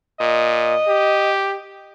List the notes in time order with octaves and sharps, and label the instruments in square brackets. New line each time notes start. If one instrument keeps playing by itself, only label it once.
[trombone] A#2 [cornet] D#5
[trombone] G4